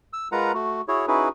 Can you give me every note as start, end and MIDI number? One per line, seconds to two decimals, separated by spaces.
0.13 0.28 88
0.32 0.52 56
0.32 0.52 65
0.32 0.52 70
0.32 0.52 71
0.32 0.52 78
0.32 0.52 82
0.54 0.81 57
0.54 0.81 66
0.88 1.06 64
0.88 1.06 66
0.88 1.06 68
0.88 1.06 73
1.08 1.29 61
1.08 1.29 63
1.08 1.29 64
1.08 1.29 66
1.08 1.29 68
1.08 1.29 71